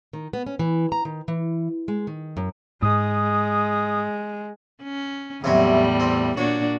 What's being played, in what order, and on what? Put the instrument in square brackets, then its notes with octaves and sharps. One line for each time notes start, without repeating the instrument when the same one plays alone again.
[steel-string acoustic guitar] D#3
B3
C#4
E3
A#5
D#3
E3
G#3
D#3
F#2
[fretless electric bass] G#2 [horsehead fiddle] G#3 [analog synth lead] D#6
[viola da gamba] C#4
[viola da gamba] E2 A2 G3 [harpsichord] C3 E3 F#3
[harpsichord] C4
[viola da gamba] A#2 D4 F#4 [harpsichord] C#5